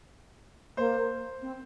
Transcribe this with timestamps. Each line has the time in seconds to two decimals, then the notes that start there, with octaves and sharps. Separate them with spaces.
0.77 A#3 C5
1.42 C4